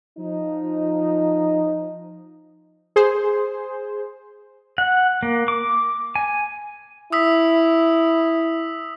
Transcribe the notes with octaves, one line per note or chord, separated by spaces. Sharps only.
F3 D#4
G#4 C5
F#5
A#3
D6
G#5
E4 D#6 E6 B6